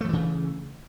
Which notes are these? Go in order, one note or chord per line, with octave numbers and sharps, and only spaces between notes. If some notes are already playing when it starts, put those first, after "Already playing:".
C#3 E3 F3 A3